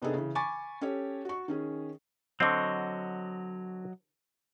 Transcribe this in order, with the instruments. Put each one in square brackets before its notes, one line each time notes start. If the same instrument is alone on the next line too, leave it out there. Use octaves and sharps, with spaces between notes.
[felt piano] C3 B3 D4 D#4 G#4 A4
C#3 E3
G#5 B5 C#6 D6 A6
C#4 G4 A4 C#5
F#4 C#6
D#3 C#4 G#4
[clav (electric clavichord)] D3 C4 [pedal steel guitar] F#3 D#5 C#6